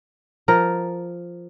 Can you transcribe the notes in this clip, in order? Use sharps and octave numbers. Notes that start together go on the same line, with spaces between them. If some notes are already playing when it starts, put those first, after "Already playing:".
F3 A#4